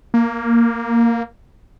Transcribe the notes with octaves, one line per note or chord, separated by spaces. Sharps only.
A#3